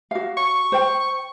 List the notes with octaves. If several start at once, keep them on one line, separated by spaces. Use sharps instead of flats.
F#4 F5
C#6
C5 G5